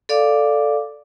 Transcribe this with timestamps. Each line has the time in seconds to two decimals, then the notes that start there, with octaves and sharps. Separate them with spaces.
0.09 A4 D5 F5 D6